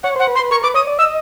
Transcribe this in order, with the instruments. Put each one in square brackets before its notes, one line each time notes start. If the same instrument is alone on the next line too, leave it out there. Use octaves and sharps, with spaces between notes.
[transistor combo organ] C#5 [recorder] F#5
[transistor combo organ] C5 [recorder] F#5
[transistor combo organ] B4
[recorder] C6
[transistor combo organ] B4
[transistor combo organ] A#4 [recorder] C#6
[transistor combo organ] B4 [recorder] D6
[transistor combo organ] C#5 [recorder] D#6
[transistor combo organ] D5
[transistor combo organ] D#5 [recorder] E6